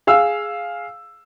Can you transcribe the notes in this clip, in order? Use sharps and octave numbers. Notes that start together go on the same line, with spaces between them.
G#4 F5 E6